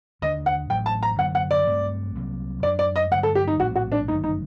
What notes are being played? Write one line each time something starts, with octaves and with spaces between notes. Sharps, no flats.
D#2 D3 A3 D4 D#5
F#5
A1 A2 F#3 G5
A5
A#5
F#2 D3 F#3 A#3 F#5
F#5
D5
G2 F#3 A3 C4
C2 C3 F#3 A#3
F#2 F#3 A#3 D4 D5
D5
D#5
G2 D3 F#3 A3 F#5
A4
G4
D#4
A#1 A2 G3 C4 F#4
F#4
D4
G1 F#2 D#3 A3 D#4
D#4